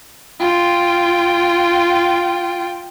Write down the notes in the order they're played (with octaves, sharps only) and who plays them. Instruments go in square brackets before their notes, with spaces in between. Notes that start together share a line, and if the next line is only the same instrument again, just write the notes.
[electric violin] F4 G5